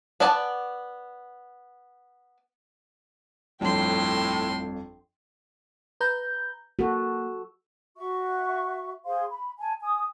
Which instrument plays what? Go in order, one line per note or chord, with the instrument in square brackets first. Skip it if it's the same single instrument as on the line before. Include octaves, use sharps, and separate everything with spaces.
[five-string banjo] B3 D5 G#5 A5
[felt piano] G1 F2 C#5 [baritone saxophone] A2 [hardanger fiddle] G5 C6
[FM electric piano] B4 A#5 G6
[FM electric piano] A#3 [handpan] F#4 A4
[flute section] F#4 E5 C#6
G#4 C5 F5 C6
B5
G#5 A5
G#5 D#6